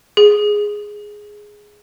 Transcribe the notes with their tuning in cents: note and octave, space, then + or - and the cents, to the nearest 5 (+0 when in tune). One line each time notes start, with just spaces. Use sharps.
G#4 +0